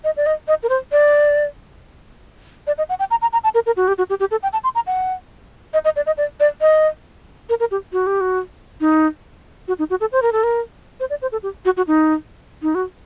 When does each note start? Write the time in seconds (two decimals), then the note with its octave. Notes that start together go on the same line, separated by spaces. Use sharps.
0.04 D#5
0.17 D5
0.26 D#5
0.48 D#5
0.63 A#4
0.69 C5
0.92 D5
2.67 D5
2.78 D#5
2.89 F#5
2.99 G5
3.11 A#5
3.22 A#5
3.33 A#5
3.44 A5
3.54 A#4
3.66 A#4
3.77 F#4
3.88 G4
3.98 F#4
4.10 G4
4.20 G4
4.31 A4
4.43 G5
4.53 A5
4.64 C6
4.75 A#5
4.87 F#5
5.73 D#5
5.84 D#5
5.96 D5
6.06 D#5
6.17 D5
6.40 D5
6.61 D#5
7.49 A#4
7.60 A#4
7.71 G4
7.93 F#4
8.07 G4
8.21 F#4
8.81 D#4
9.68 F#4
9.79 D#4
9.90 F#4
10.01 A4
10.12 C5
10.22 A#4
10.32 A4
10.43 A#4
11.00 C5
11.10 D5
11.22 C5
11.32 A4
11.43 G4
11.65 F#4
11.77 F#4
11.87 D#4
12.62 D#4
12.75 F#4